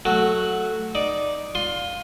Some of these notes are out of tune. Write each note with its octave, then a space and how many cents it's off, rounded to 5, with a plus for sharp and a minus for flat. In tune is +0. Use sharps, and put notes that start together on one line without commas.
F#3 -5 A3 +0 F#4 +0
D#4 +0 D5 +0
F4 +20 C6 +0